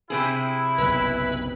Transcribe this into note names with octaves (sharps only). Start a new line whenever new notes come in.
C3 C4 E4 G#4
F#1 B1 B4